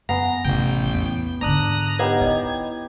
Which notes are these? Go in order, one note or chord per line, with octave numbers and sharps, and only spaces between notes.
F#2 B3 F#5 G#5 A#5
A1 C3 C4 G5
E2
G#2 D3 D4 A#5 D#6 F#6
B3 D#4 G4 B4 C#5 F#5 G#6
E4 D#5